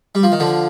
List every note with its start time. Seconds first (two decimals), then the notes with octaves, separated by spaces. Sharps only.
0.15 G3
0.23 F3
0.32 D#3
0.40 D3 F3